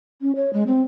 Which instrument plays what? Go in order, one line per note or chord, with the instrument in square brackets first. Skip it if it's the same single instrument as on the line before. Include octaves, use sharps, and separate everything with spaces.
[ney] C#4
C#5
G#3
C4